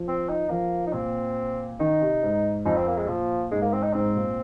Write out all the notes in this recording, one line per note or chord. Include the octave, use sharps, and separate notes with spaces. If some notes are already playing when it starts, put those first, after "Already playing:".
Already playing: F3
C4
D#4
F3 A#3
D#4
A#2 C4
D#3 D#4
C3
G#2
F2 D#4
C4
A#3
G#3
A#2 F3
G#2 G#3
A#3
C4
D#4
G#2 C4
A#2